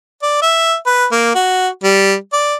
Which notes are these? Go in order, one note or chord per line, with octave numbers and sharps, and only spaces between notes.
D5
E5
B4
A#3
F#4
G3
D5